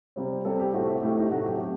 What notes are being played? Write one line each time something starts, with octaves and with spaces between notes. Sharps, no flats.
C3 G3 C4
C3 G3 C4 A4
G4
A2 A3 C4 F#4
G4
A2 A3 C4 G4
D#4
C3 F#3 A3 F#4
G4
C3